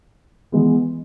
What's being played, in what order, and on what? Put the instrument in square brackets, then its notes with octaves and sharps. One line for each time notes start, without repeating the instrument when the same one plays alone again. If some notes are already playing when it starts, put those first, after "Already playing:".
[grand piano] E3 G#3 B3